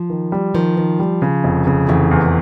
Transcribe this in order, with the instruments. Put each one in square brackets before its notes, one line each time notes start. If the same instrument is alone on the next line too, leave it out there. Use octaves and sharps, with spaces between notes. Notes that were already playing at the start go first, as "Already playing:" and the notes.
Already playing: [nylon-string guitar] F3
[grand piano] D#3
G3
[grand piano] D#3 [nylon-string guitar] F3
[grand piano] D#3
G3
C#3
F1
C#3
[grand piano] F1 [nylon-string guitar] E3
[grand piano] E2